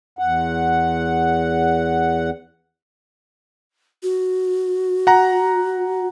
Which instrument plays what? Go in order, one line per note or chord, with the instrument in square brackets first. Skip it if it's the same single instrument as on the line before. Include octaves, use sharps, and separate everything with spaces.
[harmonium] E2 F#5
[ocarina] F#4
[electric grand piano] F#5 A#5